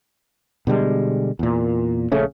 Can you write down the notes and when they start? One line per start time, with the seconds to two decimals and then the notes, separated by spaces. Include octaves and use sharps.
0.67 B2 D3 G3 G#3
1.39 E2 A#2
2.12 A#1 C#3 A3 C#4